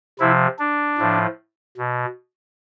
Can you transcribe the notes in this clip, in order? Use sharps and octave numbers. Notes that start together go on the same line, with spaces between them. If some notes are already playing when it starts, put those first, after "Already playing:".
C3 F3 E4
D4
A2 F3
B2